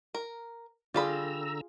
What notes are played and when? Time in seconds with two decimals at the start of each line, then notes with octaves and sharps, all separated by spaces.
0.15 A#4
0.94 D3 G3 F4 G#4 D5 A#5 B5 E6